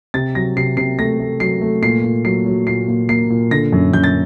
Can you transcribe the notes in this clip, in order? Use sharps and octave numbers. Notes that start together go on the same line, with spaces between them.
C3 A6
F#3 A#6
C3 C7
C3 C7
A3 A#6
A3
F#3 C7
A3
A#2 C7
A#2
F#3 C7
F#3
A#2 C7
A#2
A#3 C7
A#2
D3 A#6
F#2
F#2 G6
A6